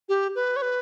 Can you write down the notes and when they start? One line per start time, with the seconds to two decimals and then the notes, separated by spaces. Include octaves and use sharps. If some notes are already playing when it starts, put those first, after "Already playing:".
0.09 G4
0.35 B4
0.56 C#5
0.62 B4